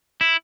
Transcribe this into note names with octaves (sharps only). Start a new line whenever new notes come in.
E4